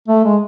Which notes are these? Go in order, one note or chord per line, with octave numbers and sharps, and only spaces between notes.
A3
G#3